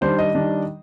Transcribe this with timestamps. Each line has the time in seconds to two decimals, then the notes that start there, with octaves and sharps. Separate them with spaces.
0.01 D#3 G3 D4 C5
0.19 D#5
0.35 D#3 G3 D4